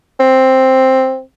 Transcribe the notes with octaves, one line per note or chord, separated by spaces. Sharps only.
C4